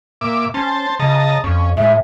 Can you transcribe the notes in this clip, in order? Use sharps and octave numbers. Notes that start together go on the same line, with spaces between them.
A#2 E5 D6
C#4 C5 A5
C#3 D#5 A5 A#5
F2 C#4
A2 G#3 E5